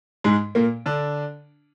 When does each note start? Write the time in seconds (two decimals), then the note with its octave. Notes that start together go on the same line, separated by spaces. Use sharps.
0.24 G#2 G#3
0.55 A#2 A#3
0.86 D3 D4